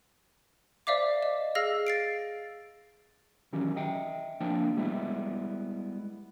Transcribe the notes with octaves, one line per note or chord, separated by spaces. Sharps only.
C5 D5 E5 F5 D6
D#5
G#4 F5 E6 F6 A#6
A6 C7 D7
D#3 E3 F#3 C#4 G4
D#5 E5 G5
F3 A#3 C4 D4 G5
G3 G#3 B3 E4